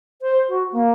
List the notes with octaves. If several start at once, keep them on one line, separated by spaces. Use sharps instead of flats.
C5
F#4
A#3